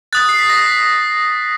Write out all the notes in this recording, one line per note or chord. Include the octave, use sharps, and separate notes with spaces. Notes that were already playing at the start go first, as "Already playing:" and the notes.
D#6 F#6 A6
C7
B6
A#6
B6